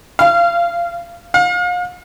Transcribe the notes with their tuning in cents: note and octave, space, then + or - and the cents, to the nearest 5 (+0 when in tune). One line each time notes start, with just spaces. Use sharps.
F5 -25
F5 +35